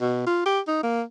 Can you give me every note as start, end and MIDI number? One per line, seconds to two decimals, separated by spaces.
0.01 0.23 47
0.26 0.45 65
0.46 0.60 67
0.67 0.80 63
0.83 1.03 58